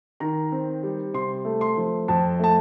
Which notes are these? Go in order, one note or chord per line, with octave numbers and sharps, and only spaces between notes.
D#3 A#5
C4
G3
C3 C6
A3
C6
F3
F2 A5
A3 A5